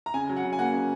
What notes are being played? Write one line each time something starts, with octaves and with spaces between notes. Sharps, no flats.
A#5
C#3 G#5
F#3
F#5
C#3
G#5
A#3 F#5
C#3